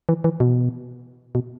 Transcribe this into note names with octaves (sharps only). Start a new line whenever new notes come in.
E3
E3
B2
B2